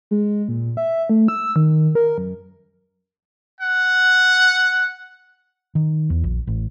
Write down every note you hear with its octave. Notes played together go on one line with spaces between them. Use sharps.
G#3
A#2
E5
A3
E6
D#3
A#4
F#2
F#5
D#3
E2
A#1
A1